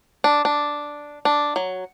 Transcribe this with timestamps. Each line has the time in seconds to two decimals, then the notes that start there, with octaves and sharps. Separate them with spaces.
0.24 D4
0.45 D4
1.25 D4
1.56 F#3